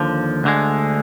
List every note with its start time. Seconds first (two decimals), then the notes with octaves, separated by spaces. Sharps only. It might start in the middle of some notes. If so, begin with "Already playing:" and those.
Already playing: D#2 D3 F3
0.44 D2 D3 G#3